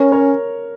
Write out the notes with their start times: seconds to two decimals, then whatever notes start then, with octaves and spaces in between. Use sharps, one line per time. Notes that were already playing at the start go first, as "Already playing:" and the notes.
Already playing: C#4 A#4 C#5
0.12 A#4 C#5